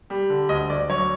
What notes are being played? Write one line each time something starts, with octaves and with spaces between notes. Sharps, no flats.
G3
D3
D2 D#5
D2 D5
F#3 C#5